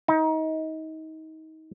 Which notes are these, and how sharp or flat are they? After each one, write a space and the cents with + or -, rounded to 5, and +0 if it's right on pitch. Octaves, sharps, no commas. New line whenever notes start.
D#4 +30